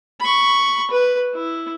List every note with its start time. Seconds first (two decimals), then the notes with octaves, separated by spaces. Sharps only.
0.21 B5 C#6
0.91 B4
1.34 E4